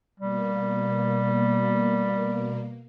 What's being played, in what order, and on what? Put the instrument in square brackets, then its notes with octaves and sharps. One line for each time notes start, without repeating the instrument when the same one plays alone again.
[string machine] B2 A#3 [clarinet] G3